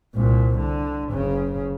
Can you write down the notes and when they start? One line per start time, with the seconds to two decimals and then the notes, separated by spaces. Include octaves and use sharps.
0.15 C2 A#2
0.59 D3
1.12 F#1 C#3